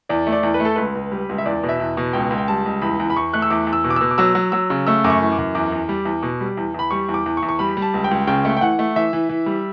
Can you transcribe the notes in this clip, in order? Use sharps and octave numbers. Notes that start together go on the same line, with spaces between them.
E2 D5
A3
D5
E2
B4
A3
A4
C#2 B4
C#2
G3
C#2
E5
E2 D5
B2
E5
E2
B2
C#2 G5
C#2
G5
G3 A5
C#2
E2 B5
E2
B5
E2 C#6
A3 F#6
E6
E2 D6
E2
E6
B2
D6
B2 E6
D6
F#3 E6
F#3
F#3 E6
C#3
A3 E6
F#2 D6
C#6
E3
D6
F#2
E2 D6
E2
G3
E2
B2
G3
E2
E2 B5
G3 C#6
E2
D6
E2
C#6
E2
C#6
G3 B5
G3
A5
C#2
G5
C#2
C#3 G5
A3
G5
E3 F#5
A3
E3 E5
E3
E3
G3